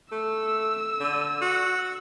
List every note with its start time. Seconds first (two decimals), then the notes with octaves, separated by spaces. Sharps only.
0.12 A3 E6
1.00 D3
1.42 F#4